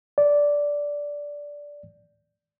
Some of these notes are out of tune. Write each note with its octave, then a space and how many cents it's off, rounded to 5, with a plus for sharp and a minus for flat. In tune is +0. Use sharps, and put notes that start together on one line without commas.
D5 -10